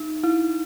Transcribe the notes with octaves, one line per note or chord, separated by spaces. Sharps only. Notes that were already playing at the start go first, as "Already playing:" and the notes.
Already playing: D#4
E4